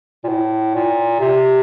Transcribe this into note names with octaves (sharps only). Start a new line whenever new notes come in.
A#2
A2
A#2
C3